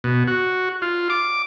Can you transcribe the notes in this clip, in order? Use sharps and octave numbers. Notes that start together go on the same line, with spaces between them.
B2
F#4
F4
D6